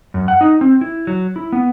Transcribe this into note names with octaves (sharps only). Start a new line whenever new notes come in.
F#2
F#5
D#4
C4
E4
F#3
E4
B3